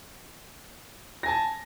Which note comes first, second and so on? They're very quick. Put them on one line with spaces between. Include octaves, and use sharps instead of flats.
A#6 G#5 A5